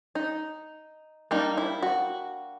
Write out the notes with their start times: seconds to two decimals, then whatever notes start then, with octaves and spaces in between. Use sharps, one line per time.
0.15 D#4
1.31 G3 A#3 D4 D#4
1.57 E4
1.82 F#4